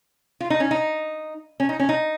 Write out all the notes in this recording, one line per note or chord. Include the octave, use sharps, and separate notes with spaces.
F4
D#4
C#4
D#4
C#4
D#4
C#4
D#4